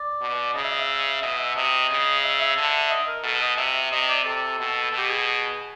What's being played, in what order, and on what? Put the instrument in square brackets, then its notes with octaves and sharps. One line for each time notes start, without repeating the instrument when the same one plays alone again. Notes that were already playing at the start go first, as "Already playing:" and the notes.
Already playing: [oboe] D5
[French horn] B2
[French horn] C#3 [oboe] D#5
[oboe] E5
D#5
E5
[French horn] B2 [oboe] D#5
[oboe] E5
[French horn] C3 [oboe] D#5
[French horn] C#3
[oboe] D#5
E5
E5
[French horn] D3
[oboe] D#5
A#4
[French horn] B2 [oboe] A4
[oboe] D#5
[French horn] C3 [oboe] E5
[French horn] C3 [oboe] D#5
[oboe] D5
[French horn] C3 [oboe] A4
[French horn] B2
[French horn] B2 [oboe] G4
[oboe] G#4